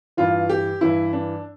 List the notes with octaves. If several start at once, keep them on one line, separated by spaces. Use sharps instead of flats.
G2 E3 F4
G4
G2 E3 E4
D4